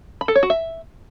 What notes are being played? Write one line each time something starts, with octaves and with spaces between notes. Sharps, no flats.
B5
A4
C#5
F#4
E5